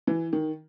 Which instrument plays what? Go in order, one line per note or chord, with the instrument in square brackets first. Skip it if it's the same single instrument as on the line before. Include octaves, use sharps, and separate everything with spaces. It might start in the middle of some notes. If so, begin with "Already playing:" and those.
[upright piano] E3
D#3